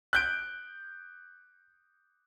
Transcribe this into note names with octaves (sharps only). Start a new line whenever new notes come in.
F#6 G6 D7